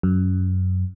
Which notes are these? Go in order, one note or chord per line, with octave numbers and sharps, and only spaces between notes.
F#2